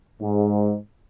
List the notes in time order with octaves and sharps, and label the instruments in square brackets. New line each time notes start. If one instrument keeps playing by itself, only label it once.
[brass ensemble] G#2